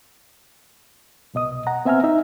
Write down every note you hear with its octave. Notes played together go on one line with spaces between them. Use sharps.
C2 B2 D#5 D#6
F#5 A#5
B3 C4 E5 G#5 A#5 F6
D#4 E5